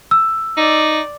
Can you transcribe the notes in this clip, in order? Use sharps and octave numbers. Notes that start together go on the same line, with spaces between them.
E6
D#4 D5